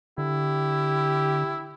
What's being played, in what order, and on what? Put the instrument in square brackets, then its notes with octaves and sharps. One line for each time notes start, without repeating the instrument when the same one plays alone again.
[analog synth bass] D3 [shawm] E4 [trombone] G4